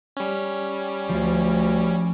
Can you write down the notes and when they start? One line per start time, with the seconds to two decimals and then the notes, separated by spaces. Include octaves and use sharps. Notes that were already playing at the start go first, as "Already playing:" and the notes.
0.17 G3 C#4
1.09 D2 F3